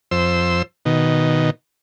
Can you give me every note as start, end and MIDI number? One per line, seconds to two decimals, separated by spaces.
0.11 0.62 41
0.11 0.62 72
0.11 0.62 88
0.85 1.50 47
0.85 1.50 51